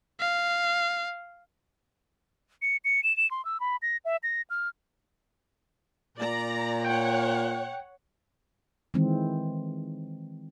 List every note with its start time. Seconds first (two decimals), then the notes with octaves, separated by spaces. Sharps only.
0.20 F5
2.62 C#7
2.85 C#7
3.04 E7
3.17 E7
3.31 C6
3.45 E6
3.60 B5
3.82 A#6
4.05 E5
4.23 A#6
4.50 F6
6.18 A#2 D5 A#5
6.85 C#5 F#5 G5
8.94 D#3 E3 G#3 C4